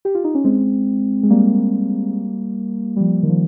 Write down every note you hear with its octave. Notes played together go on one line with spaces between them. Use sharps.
G4
F4
D#4
C#4
G#3 C4
G#3
G3 A#3
G3
F3
D#3
F3